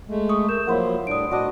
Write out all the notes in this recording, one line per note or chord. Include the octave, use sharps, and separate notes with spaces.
G#3 A3
G#4 C#6 D#6
A#4 G6 E7
F3 F#3 A#3 E4 A#4 C5 F#5
A2 G3 D4 D#6 D7
A2 D4 F#4 D#5